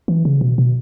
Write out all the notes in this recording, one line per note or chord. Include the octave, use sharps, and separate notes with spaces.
E3
C#3
B2
B2